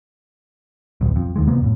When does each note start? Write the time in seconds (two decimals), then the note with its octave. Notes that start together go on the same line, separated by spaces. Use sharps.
1.01 D1 B1
1.16 F2
1.36 D#2 D#3 G#3
1.48 C3 A#3 B3
1.61 F2 A2